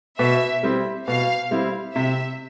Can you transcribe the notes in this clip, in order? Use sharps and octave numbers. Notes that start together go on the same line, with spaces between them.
B2 E5
G3 C4 E4
B2 F5
G3 C4 E4
C3 E5